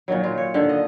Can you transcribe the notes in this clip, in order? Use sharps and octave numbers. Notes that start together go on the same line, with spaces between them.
A#2 D#3 F#3
A#2 F4
C#5
D3 D#3
D#5